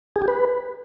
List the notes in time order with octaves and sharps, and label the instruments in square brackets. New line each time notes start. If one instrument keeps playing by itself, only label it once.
[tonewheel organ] G#4
G4
B4